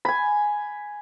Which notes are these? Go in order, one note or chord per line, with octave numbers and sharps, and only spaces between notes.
G#5 B5